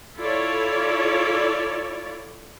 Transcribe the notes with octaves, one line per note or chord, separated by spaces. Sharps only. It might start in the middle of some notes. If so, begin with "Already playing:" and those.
E4 F4 A4 C#5 D5